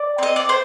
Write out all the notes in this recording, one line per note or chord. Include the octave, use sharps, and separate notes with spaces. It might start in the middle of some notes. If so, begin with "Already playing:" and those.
Already playing: D5
C4 D#5
D5
C5